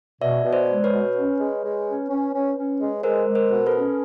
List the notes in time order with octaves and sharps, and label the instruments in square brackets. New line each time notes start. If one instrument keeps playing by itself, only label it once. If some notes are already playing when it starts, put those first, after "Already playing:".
[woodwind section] B2 [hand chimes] D5 E5
[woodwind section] B2
[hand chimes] C5 D5
[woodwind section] G#3
[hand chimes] B4 C#5
[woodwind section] B2
C#4
G#3
G#3
C#4
C#4
C#4
C#4
G#3
[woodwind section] G#3 [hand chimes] A#4 C5
[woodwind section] G#3
[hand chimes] A#4 C5
[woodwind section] B2
[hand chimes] A4 B4
[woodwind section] C#4